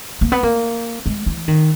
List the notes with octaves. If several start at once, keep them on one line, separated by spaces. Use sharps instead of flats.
A#3
B3
A#3
G#3
E3
D#3